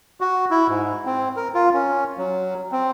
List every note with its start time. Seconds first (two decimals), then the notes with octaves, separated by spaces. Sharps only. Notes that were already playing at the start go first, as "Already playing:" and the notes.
0.21 F#4
0.51 E4
0.68 G#2
1.05 C4
1.36 A#4
1.55 F4
1.73 C#4
2.17 F#3
2.72 C4